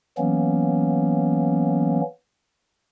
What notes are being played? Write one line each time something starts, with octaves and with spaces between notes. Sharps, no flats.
E3 F#3 A#3 B3 C#4